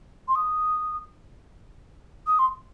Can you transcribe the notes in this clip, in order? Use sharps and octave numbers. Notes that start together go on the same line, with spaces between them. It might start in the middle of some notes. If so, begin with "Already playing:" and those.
C6
D#6
D#6
C6